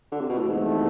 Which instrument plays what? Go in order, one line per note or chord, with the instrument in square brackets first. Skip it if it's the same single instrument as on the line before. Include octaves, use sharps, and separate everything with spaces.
[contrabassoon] D3
C3
B2
A2
[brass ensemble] E2 C3 F3 A3 [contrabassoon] G#2